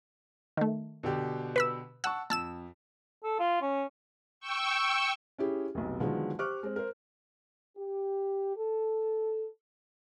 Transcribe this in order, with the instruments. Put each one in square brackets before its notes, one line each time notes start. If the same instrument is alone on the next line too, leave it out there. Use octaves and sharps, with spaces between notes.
[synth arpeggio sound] D#3 A3
[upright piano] B2 D3 G4
[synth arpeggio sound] B4 B5 E6
[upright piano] F#5 A5 C#6 [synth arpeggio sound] E6 F#6
[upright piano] F2 [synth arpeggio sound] A5 E6 E7
[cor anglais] A4
F4
C#4
[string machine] G5 C#6 E6
[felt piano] C#4 E4 G4 G#4
F1 B1
D3 D#3 F3 F#3 G#3 B3
G4 C5 C#6 D6 F6 F#6
G#3 C4
A#4 C5
[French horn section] G4
A4